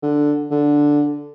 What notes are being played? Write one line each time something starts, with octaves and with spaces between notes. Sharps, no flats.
D3
D3